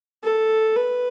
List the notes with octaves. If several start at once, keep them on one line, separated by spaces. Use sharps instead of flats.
A4
B4